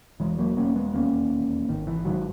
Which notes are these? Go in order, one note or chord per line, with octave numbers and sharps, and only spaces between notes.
E1 E3 G#3
F#3 A#3
E1 A#3 C#4
G#3 B3
D#2 A#3 C#4
E1
G#1 D#3
E3
G#2 D#3 F#3